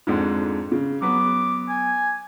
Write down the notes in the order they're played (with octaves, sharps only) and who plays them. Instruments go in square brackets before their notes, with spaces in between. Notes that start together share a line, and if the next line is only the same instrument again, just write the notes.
[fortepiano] F2 G#2 D3
C#3
[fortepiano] F#3 B3 [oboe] D6
[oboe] G#5